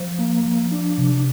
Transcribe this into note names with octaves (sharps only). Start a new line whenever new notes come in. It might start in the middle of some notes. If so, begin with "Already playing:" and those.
Already playing: F3
A#3
F3
D4
C3